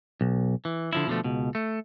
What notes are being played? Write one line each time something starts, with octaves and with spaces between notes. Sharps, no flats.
B1
E3
D3 F3 E4
B2 D3 D#3 F3 A3
C#2 B2
A3